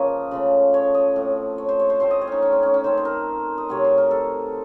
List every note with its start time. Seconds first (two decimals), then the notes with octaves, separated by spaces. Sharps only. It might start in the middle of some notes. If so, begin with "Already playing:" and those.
Already playing: C#3 F3 A#3 A#4 C#5 D#5
0.31 C#3 F3 A3
0.74 C#5
0.94 D#5
1.16 A2 A3 C4
1.58 C#5
1.69 C5
1.80 C#5
1.90 C5
2.00 A2 A3 C4 C5
2.11 D#5
2.21 C#5
2.27 C#4 D#4
2.42 C#4
2.53 C4
2.63 C#4
2.74 C#4
2.84 D#3 A3 C4 C5
2.98 C5
3.05 A#4
3.58 D#5
3.69 C3 F#3 A3 C4 C#5
3.84 C5
3.98 A#4
4.11 A4